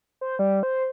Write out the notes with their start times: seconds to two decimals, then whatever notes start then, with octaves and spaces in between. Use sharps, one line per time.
0.21 C5
0.39 G3
0.63 C5